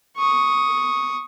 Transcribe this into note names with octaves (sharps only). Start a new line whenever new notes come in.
C#6 D#6